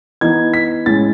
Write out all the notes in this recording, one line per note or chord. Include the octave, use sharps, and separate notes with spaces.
E3 B3 D#4 G#6
B6
A2 G#3 C#4 A6